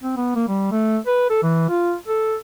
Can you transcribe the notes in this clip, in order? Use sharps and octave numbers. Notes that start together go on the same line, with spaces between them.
C4
B3
A#3
G3
A3
B4
A4
E3
F4
A4